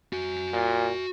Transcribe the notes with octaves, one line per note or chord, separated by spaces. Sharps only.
F#4 G#5
A#2